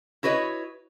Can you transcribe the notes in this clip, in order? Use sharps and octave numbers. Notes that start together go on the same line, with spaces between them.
E4 F#4 B4 C#5 D#5